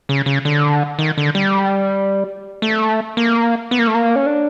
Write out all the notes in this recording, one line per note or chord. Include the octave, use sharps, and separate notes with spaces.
C#3
C#3
D3
D#3
D3
G3
A3
A#3
B3
A#3
A3
A#3
C#4
D4